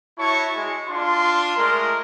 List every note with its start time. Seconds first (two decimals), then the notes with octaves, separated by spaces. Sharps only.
0.18 E4 F#4 C#5 A5 C#6
0.56 G#3
0.88 D4 F4 C6
1.57 G#3 A3 A#4